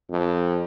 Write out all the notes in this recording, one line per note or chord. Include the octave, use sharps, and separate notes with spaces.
F2